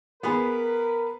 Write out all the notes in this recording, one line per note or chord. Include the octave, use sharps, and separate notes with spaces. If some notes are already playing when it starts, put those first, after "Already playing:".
B3 G#4 A#4 B4 B5